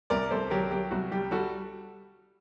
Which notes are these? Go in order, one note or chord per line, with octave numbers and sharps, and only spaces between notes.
C2 A#4 D5
C2 A4 C5
F#3 G4 A#4
F#3 G4
C2 F#4
G3 G4
G3 F#4 A4